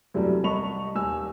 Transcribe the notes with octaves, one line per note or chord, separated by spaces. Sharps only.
F#2 C3 E3 F#3 G3 A3
C2 D#5 A5 B5 C#6 F7
D#1 G#5 E6